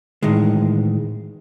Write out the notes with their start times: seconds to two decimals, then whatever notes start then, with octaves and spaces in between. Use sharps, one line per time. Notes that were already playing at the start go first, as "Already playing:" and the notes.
0.23 A2 D#3 E3 G#3